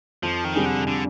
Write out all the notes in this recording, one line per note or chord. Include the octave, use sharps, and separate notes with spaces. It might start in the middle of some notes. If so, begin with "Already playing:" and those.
F2 F3
D#3
C3 G3 D4 G#4
D3
D3